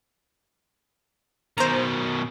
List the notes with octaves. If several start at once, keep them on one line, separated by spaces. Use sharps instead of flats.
B2 D#3 C5 A#5